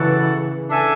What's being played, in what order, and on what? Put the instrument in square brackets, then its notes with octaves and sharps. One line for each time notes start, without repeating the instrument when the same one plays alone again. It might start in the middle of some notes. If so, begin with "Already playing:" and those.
Already playing: [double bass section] C#3 E3 [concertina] F#4 A4 D5 F#5
[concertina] D4 A4 E5 G#5